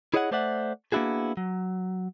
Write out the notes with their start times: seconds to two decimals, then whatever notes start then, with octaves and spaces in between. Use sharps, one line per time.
0.14 E4 G#4 C#5 D#5 F5 F#5
0.31 A3 C5 D5 E5 F#5
0.92 A#3 B3 D4 E4 F#4 G#4
1.37 F#3